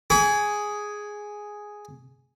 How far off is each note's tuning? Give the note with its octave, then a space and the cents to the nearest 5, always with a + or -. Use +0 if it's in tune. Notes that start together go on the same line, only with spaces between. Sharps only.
G#4 +0 B5 +0 D6 -45